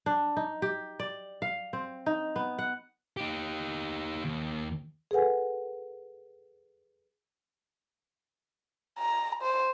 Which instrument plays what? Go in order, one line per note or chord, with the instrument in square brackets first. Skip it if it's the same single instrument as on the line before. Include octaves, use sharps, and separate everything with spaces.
[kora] D4
D#4
G4
D5
F5
C4
D#4
B3
F#5
[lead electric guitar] D#4 G4
D#2
[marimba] G#4 A4 B4 F#5 G#5
[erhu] A#5
C5